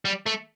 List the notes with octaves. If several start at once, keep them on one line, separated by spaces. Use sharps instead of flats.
G3
A3